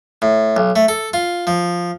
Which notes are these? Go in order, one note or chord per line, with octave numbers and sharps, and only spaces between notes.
A2
B1
A3
A4
F4
F3